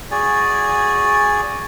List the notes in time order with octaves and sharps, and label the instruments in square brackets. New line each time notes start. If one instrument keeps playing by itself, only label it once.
[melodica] F#4 G#4 D5 G#5